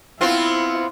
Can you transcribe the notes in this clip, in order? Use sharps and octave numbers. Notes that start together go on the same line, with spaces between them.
B3 C4 E4 F4